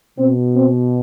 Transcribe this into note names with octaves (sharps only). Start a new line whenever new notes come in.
B2 C4
C4